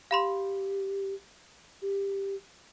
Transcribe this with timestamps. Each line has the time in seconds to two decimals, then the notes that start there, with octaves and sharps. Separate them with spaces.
0.11 G4 F5 B5 C6
1.82 G4